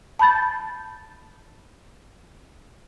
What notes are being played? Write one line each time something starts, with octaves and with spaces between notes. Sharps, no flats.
A5 B5 G6 A6